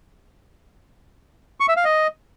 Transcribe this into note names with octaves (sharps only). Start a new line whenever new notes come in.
C#6
E5
F5
D#5